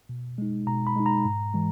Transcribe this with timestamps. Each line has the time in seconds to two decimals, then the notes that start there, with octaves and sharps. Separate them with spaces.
0.09 B2
0.38 G#3 D#4
0.67 B2 A#5
0.87 B5
0.96 G#3 D#4
1.06 A#5
1.25 G#2
1.54 E3 G#3